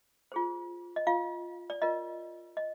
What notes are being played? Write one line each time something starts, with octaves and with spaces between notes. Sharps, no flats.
F4 G#4 C5
D#5
F4 F5
D5
F4 A#4 D#5
D#5